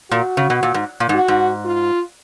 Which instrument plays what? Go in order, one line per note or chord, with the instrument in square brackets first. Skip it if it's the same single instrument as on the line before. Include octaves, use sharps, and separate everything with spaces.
[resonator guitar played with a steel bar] A#2 [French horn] F#4
[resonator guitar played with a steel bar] C#3
B2
A#2
G#2
A#2
G#2
[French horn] F#4
[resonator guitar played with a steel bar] G#2
[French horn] F4